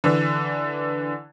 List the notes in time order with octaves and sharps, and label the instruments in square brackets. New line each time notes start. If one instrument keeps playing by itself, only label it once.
[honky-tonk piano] D3 E3